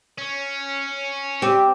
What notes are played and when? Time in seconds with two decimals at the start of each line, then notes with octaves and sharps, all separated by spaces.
0.18 C#4
1.42 C4 G4